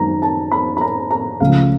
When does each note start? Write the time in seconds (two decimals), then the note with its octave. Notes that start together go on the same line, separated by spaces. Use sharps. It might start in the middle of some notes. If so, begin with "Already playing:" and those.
Already playing: F#2 D#3 G#3 A#5
0.22 A5
0.51 B5
0.77 B5
0.81 A#5
1.11 A#5
1.40 C#2 C#3 F3 A3 F5